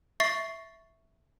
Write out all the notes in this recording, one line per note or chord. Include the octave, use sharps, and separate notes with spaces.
E5 C#6 A6 C7